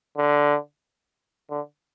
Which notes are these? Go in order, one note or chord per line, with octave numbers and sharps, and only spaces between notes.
D3
D3